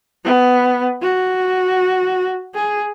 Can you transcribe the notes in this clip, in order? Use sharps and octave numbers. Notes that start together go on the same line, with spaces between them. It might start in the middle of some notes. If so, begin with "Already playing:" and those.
B3
F#4
G#4